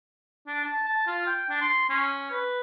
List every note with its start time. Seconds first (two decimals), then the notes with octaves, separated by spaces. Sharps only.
0.47 D4
0.64 A5
0.88 A5
1.07 F4
1.27 G5
1.49 D4
1.61 C6
1.89 C#4
2.31 B4